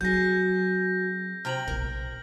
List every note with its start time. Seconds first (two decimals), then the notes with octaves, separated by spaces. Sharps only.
0.01 F#3 C4 F#4 G#4 G6 A#6
1.45 C3 G5 A#5 F6 F#7
1.68 A#1 B2 A#4